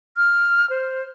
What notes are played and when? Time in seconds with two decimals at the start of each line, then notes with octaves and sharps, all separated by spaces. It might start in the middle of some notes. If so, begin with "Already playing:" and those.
0.17 F6
0.70 C5